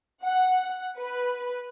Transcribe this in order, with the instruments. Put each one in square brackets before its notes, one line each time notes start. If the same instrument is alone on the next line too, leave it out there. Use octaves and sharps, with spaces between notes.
[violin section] F#5
B4